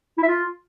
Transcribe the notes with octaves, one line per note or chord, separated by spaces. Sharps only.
E4
E5
F4